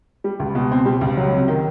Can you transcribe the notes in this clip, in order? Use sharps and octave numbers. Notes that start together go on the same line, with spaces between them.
G3
C#2
B2
C4
G3
C#2
F#3
C3
D#3